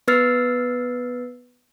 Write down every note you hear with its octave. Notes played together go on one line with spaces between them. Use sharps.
B3 B4 E6 F6 A6 C7